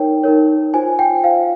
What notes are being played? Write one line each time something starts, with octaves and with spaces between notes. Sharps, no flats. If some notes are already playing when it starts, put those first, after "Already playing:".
Already playing: D#4 A#4 C#5 G5
D#4 A#4 C#5
F4 C5 G#5
G5
F4 C5 F5